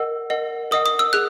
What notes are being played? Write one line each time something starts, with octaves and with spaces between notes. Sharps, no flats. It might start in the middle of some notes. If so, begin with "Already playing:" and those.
Already playing: A#4 D#5 F#5 E6
A#4 D#5 F#5
A#4 D#5 F#5 D#6
D#6
E6
G#4 F#6